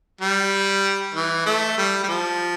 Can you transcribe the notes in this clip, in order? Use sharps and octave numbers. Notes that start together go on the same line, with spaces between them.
G3
E3
A3
G3
G3
F3